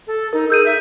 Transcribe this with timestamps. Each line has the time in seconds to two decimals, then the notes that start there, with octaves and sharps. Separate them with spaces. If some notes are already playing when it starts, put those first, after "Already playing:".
0.07 A4
0.33 D#4 A#4
0.50 G#4 E6 G6 D#7
0.66 E5